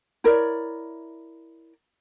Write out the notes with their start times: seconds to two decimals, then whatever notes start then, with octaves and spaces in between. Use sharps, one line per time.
0.24 E4 A#4 C#5 D5